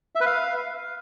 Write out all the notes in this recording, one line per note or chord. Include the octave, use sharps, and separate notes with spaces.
E5
B4
F5